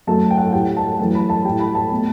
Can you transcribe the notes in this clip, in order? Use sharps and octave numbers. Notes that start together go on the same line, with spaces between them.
F#2 F#3 A3 A5
G5
F#5
A2 G3 G5
A5
F#2 E3 A3 A5
B5
A5
A2 G3 G5
B5
A5
B2 A3